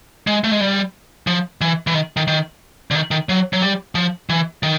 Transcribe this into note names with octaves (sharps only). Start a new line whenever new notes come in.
G#3
A3
G#3
G3
F3
E3
E3
D#3
D#3
D#3
D3
D#3
D#3
F#3
F#3
G3
F3
E3
D#3